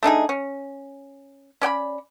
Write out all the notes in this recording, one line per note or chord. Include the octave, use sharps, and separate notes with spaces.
A3 D4 D#4 G#4
C#4
C#4 D5 G5 B5